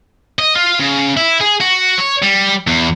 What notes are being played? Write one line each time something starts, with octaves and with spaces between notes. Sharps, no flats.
D#5
F4
C#3
E4
G#4
F#4
C#5
G3
E2